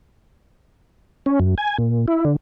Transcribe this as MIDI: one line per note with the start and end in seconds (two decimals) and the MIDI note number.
1.26 1.39 61
1.40 1.55 42
1.58 1.77 80
1.78 2.06 46
2.08 2.25 64
2.25 2.36 50